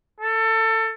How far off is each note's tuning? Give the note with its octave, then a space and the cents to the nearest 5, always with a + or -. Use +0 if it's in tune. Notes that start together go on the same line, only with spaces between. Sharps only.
A4 +25